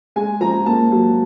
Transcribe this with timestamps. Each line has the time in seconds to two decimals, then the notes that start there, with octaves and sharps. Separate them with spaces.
0.16 G#3 G#5
0.41 F3 A#5
0.66 A#3 A5
0.92 F#3